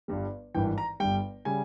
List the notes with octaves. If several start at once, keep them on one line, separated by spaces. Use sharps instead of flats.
G1 G2 G3
G#1 G2 E3 G5
A#5
G1 G2 G3 G5
C#3 G3 G#5